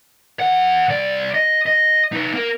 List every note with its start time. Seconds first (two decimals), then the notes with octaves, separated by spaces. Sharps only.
0.39 E2 F#5
0.88 C2 D5
1.34 D#5
1.66 D#5
2.13 D#4 B4
2.33 A#3 A#4